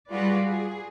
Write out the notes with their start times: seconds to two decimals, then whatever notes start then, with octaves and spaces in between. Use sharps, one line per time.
0.10 G3 F4 F#4 G#4 B4 D5
0.47 G#4